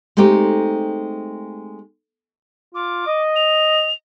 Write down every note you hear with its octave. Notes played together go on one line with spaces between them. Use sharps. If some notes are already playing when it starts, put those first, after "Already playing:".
G#3 A3 C4 D#4 G4
F4 D6
D#5
F7